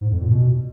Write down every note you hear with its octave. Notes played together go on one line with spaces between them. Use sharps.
G#2
F2
A#2
B2